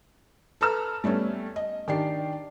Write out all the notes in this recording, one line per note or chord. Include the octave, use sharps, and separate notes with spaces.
A4 B4 A#5 E6 F6
G3 A3 B3 C#4
D#5
D#3 D4 G4 C7